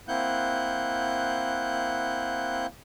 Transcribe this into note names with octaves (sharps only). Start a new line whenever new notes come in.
A#3 C4 E4 F#5 F#6 G6